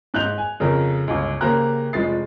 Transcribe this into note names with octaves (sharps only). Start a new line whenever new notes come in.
G#2 F#6 G6 F7
G#5
F2 C#3 A#4
G1 C#2
C#3 A#3 G4 C5 A#5 F#6
F1 F3 G#3 A6 C7